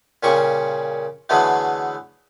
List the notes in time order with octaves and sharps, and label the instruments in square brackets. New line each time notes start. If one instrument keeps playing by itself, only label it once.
[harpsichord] A#2 C#3 G3 C#4 C#6
D3 E3 F#3 G#3 A3 B3